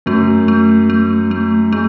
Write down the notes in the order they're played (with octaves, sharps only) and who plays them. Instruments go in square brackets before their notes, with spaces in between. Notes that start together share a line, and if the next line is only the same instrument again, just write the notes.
[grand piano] F#2 F#3 [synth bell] A3
[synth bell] A3
A3
A3
[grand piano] G#3 [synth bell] A3